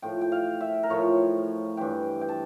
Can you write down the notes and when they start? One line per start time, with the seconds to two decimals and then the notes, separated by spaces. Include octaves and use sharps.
0.02 A2 F3 G5
0.21 G5
0.32 F5
0.61 E5
0.83 A#4
0.90 A2 F3 C#5
1.77 G2 E3 G5
2.21 G5
2.29 A5